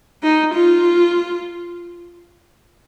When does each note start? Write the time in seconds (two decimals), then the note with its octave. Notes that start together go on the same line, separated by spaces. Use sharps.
0.23 D#4
0.54 F4